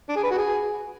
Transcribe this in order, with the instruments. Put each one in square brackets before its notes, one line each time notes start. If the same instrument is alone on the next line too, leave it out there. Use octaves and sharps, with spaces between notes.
[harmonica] D4
G#4
B4
F#4
G#4